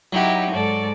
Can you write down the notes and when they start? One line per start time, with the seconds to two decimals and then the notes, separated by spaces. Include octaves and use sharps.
0.13 F#3 D#4 E4 F#4 G4
0.51 G#2 A4 D5